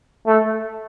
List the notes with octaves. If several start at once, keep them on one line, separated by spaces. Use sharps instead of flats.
A3